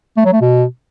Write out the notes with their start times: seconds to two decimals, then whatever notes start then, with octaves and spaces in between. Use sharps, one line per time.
0.17 A3
0.25 F#3
0.33 A3
0.41 B2